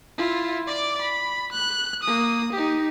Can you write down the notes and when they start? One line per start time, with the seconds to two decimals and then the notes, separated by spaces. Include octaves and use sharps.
0.18 E4 F4
0.68 D5 D6
1.02 B5
1.52 F#6
2.03 A#3 D#6
2.53 D#4 G4